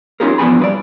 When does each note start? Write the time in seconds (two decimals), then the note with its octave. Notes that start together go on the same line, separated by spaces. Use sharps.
0.20 C#4 D#4 F4 G4 G#4 A#4
0.38 E2 B2 F3 D4 G#5 B5
0.59 G2 B4 D5